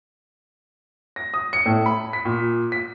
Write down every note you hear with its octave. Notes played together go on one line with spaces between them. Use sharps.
A#6
D#6
C#7
A2
B5
B6
A#2
B6